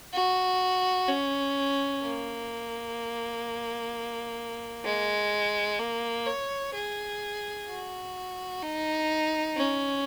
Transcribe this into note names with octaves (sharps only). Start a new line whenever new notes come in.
F#4
C#4
A#3
G#3
A#3
C#5
G#4
F#4
D#4
C#4